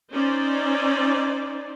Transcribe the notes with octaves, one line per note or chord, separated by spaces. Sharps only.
C#4 D#4 C5 D5